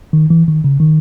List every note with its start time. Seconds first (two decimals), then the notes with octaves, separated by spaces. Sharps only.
0.13 D#3
0.30 E3
0.48 D#3
0.64 C#3
0.80 D#3